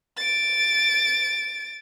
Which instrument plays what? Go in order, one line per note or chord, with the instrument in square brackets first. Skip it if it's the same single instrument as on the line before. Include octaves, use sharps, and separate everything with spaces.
[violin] A6 D7